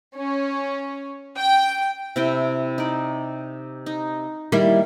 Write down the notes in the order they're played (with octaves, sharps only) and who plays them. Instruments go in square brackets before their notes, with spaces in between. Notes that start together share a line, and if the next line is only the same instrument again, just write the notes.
[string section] C#4
G5
[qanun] C3 E4 G5
D#4 D5
D#4
[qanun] D#3 [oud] G3 A#3 E4